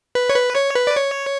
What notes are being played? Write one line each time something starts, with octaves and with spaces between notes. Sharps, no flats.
B4
C#5
B4
C#5
B4
D5
C#5